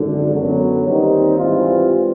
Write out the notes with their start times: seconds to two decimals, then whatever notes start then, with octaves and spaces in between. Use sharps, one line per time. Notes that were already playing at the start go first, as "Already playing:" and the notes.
Already playing: G#1 F#2 D3
0.33 F#2 D3 F#3 B3
0.86 D#2 D#3 G3 C4 D#4
1.38 G#2 E3 G3 C4 F4